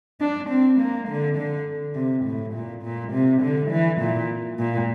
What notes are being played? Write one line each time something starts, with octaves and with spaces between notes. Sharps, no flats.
D4
C4
A#3
D3
D3
C3
A2
A#2
A#2
C3
D3
E3
A#2
A#2